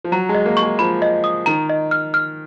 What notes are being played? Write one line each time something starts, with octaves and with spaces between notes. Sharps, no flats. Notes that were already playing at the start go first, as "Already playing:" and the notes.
F3
F#3 A#5
G#3
D#5
A#3
C#6
G#3
F3 B5
D#5
D#6
D#3 A#5
D#5
F6
F6